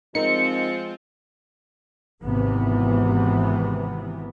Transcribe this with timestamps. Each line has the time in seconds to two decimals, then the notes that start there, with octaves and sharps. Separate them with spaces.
0.15 F3 G#3 C4 D#4 F4 A#4 C#7
2.24 G#1 C3 E3 B3